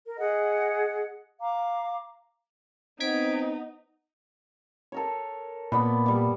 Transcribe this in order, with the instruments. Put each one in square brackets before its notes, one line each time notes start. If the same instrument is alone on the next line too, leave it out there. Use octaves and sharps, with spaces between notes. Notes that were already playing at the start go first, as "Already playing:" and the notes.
[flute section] A#4
G#4 D#5 F#5
F5 A#5 D6
[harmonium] B3 [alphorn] C4 [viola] D#4 [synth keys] G#6 B6 D7
[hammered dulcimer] A4 A#4 C#5
[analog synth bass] A#2 [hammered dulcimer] B3 D5 B5
[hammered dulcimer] G3 D6